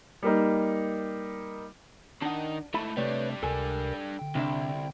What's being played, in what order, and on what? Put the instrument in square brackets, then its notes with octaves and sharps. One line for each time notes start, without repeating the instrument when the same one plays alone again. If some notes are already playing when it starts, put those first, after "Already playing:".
[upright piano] G3 A#3 D#4
[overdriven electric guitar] D#3 D#5 [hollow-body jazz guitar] D4 F#5
[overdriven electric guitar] G#2 A3 [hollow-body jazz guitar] E4 A5 B5
[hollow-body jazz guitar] C3 A3 [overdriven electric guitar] G3 D4 [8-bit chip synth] B4 C#5 D5
[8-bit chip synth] C#2 C3 A#4 [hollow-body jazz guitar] A4 G#5
[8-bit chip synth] D3 G5
[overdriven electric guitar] C2 [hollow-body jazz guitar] C3 D4 E5